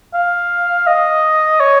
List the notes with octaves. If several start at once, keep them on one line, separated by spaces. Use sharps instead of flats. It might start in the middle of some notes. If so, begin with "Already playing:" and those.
F5
D#5
C#5